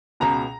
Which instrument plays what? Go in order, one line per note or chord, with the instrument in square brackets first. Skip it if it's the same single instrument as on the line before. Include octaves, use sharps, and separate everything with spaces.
[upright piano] C#2 B2 A#5